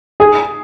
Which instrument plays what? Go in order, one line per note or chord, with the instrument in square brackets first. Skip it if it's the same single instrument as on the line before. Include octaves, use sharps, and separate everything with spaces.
[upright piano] G#4